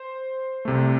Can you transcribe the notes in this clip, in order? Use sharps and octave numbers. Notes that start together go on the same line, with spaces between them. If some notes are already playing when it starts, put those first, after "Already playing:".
Already playing: C5
C2 C3 A3